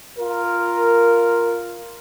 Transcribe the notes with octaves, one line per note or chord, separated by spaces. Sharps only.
F4 A#4